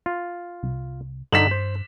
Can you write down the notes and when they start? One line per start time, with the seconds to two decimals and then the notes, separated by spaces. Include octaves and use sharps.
0.06 F4
0.63 C2
1.32 G2 D3 D#4 B6 E7 F#7
1.51 C5